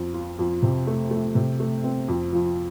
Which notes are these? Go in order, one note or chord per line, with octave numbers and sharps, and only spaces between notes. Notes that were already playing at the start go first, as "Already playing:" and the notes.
Already playing: F2
F4
F2
C3
A3
A3
C3
A3
C4
F2
F3